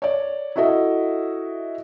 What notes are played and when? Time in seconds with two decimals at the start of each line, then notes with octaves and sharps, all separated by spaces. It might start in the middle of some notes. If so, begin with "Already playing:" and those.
0.02 C#5 D5
0.56 E4 F#4 A4 D#5 E5